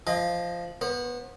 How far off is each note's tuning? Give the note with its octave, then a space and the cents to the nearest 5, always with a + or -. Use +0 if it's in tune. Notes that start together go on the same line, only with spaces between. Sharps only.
F3 -10 D#5 +0 G5 +45
B3 -15 C5 +35